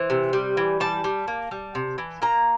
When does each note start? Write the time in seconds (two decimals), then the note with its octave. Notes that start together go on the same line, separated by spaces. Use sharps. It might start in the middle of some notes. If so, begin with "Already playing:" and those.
Already playing: E3 C5
0.10 C3
0.33 G3
0.57 E3
0.80 G3 A5
1.04 G3
1.28 A#3
1.51 G3
1.75 C3
1.98 E3
2.22 A#3 A#5